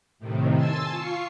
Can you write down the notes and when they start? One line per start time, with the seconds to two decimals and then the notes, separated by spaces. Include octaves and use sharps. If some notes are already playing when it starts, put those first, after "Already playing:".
0.19 A2 C3 D#3
0.55 G#5 A5 C6 E6 A6
0.90 F4 C#6 C7